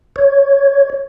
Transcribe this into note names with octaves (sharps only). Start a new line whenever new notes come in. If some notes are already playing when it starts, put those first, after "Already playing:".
C#5